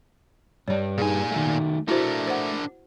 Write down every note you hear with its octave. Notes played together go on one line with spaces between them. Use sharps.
G2 G3 C#5 D5
A#2 D#4 G4 G#4 G#5
D#3 A3
A3 D4 E4 F#4 A#4 C5
C5 F#5